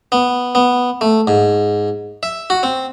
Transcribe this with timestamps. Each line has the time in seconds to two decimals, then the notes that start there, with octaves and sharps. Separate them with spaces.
0.12 B3
0.55 B3
1.01 A3
1.27 G#2
2.23 E5
2.50 F#4
2.63 C4